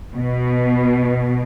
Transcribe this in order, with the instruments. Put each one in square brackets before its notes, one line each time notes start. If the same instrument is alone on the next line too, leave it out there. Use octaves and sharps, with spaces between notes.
[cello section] B2